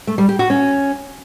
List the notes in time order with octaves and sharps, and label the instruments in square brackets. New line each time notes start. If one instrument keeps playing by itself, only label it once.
[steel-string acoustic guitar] A3
G3
G4
F#4
C#4